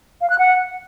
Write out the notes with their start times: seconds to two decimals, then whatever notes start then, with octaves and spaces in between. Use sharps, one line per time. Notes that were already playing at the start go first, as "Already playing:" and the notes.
0.21 F5
0.30 F#6
0.39 F#5